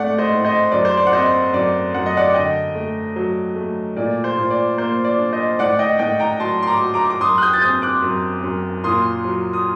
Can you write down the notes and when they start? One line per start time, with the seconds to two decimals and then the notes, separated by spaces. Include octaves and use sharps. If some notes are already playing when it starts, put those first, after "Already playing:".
Already playing: A2 A3 C4 D5 F#5
0.18 C5 D#5
0.32 A2
0.45 C5 D#5
0.72 F#2 D5
0.85 C5
0.97 D5
1.07 F#5
1.12 C4 C5 D#5
1.53 F#2 D5
1.94 F#2 F#5
2.06 D#5
2.17 D5 F#5
2.34 D3 D#5 G5
2.75 A3
3.16 F#3
3.56 A3
3.96 A#2 D5
4.24 C5
4.37 A#2
4.50 D5
4.78 A#3 C5
5.04 D5
5.18 D4
5.33 C5 D#5
5.59 A2 D5 F#5
5.79 D#5 G5
5.99 A2 D#5 G5
6.20 G5 A#5
6.40 F#3 A5 C6
6.62 C6
6.67 A#5 D6
6.82 F#3
6.94 A#5 D6
7.10 D6
7.21 F#2 C6 D#6
7.38 F#6
7.42 D#6 G6
7.53 A6
7.62 C4 D#6 G6
7.82 D6 F#6
8.02 F#2
8.44 F#2
8.84 A#2 C6 D#6
9.25 F#3
9.53 D#6